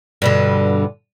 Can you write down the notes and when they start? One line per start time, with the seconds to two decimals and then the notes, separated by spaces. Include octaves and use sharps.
0.22 G2 B2 D3